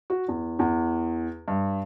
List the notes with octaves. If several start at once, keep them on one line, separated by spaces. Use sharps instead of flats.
F#4
E2
E2
G2